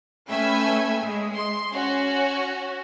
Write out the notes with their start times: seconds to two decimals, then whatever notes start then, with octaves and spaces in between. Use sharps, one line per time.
0.28 A3 C#4 B4 E5 G5 G#5
1.02 G#3
1.37 C6
1.73 C#4 F#4